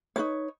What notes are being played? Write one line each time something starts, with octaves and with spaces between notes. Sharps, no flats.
D#4 F#4 B4 C#5